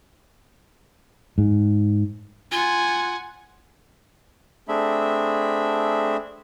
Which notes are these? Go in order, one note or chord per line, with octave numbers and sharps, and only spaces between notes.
G#2
F4 F#5 G#5
A3 C4 D4 G#4 E5 B5